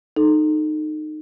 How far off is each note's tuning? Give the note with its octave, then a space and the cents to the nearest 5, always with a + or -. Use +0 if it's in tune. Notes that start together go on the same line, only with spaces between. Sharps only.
D#4 -20 A4 -10